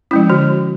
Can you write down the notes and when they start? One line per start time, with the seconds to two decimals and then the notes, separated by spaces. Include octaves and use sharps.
0.11 F3 G#3 C#4 E4
0.30 D3 F#4